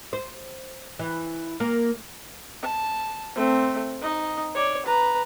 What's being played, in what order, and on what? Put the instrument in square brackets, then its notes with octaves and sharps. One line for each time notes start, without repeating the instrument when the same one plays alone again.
[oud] C5
E3
A#3
[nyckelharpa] A5
A3 C4
D#4 D#5
C#5 D5
B4 A#5